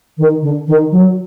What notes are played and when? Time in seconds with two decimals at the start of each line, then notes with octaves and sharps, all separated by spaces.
0.18 D#3
0.42 D3
0.67 D#3
0.92 F#3